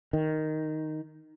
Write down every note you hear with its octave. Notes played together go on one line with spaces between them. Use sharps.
D#3